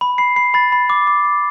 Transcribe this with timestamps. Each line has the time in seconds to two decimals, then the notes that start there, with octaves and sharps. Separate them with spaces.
0.01 B5
0.18 B5 C7
0.36 B5 C7
0.54 B5 A6
0.72 B5
0.90 D6
1.07 D6
1.25 D6